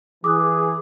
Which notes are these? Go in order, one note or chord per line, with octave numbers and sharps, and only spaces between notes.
E3 G#4 D6 D#6 F#6